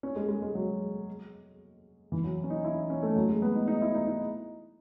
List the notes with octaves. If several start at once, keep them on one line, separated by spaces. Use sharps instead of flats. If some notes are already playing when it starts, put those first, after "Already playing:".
C#4
G#3
G#3
G#3
F#3
E3
F#3
C#4
D#4
E4
C#4
A3
F#3
G#3
B3
D#4
D#4
E4
D#4
D#4